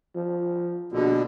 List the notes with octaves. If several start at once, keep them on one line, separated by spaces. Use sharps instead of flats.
F3
A#1 B2 D3